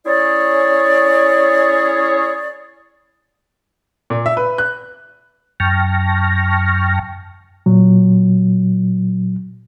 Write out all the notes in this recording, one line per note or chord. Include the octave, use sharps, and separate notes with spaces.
C#4 E4 G#4 C#5 D5
A#2
E5
B4
F#6
F#2 G5 A5 C#6 F6 A#6
A#2 F#3